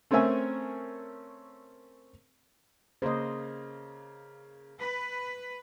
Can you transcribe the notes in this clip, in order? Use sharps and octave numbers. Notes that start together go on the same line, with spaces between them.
A3 C4 C#4 A#4 E5 G#5
C#3 A#3 C5 D#5
B4